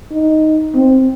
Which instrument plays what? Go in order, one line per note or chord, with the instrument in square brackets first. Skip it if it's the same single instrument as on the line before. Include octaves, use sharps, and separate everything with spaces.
[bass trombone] D#4
C4